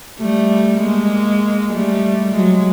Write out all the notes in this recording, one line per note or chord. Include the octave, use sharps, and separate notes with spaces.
G3 A3
G#3 A#3
G3 A3
F#3 G#3